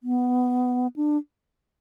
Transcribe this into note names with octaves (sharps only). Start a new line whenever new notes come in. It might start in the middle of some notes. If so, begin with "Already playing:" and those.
B3
D4